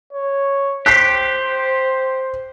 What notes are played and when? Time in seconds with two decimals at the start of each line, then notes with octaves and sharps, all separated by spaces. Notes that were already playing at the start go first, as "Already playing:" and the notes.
0.13 C#5
0.86 G4 C5 F#6 B6 C7